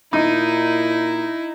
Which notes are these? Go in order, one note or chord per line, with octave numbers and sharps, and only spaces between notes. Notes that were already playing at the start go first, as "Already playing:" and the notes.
A#2 D#4 E4